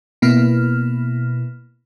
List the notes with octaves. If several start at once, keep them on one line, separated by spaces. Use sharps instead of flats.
B2 A#3 B3 E4 F6